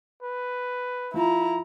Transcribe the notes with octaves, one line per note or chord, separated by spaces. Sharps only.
B4
F3 E4 A#5